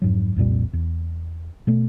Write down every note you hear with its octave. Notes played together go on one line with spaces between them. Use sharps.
F2 G#2 F#3
C2 F2 A#2 G3
E2
B2 A3